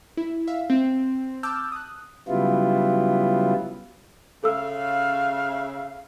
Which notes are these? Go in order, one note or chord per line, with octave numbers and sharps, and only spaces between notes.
E4
E5 F5
C4
A5 D6 E6 F6 G6
D#6 F#6
C#3 F#3 G3 B3 E4 F4
C#3 A4 E5 F5 E6